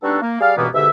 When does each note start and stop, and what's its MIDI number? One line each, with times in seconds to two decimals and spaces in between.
0.03 0.21 55
0.03 0.21 59
0.03 0.21 62
0.03 0.21 63
0.03 0.21 66
0.03 0.21 69
0.22 0.38 58
0.40 0.53 55
0.40 0.53 68
0.40 0.53 74
0.40 0.53 77
0.57 0.67 37
0.57 0.67 43
0.57 0.67 47
0.57 0.67 52
0.57 0.67 58
0.57 0.67 59
0.74 0.88 44
0.74 0.88 47
0.74 0.88 50
0.74 0.88 67
0.74 0.88 76